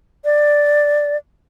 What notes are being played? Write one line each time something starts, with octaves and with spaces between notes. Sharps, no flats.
D5